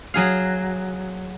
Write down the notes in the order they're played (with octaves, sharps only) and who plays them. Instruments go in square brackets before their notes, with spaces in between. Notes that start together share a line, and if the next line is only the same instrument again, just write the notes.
[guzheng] F#3 G#4 F5